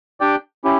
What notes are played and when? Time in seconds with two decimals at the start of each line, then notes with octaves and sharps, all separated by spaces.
0.20 D4 G4 D5 G5
0.64 C#4 E4 G4